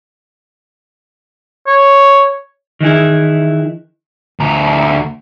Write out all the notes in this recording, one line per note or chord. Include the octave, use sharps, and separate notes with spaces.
C#5
D#3 E3 E4 G#4
D2 A#5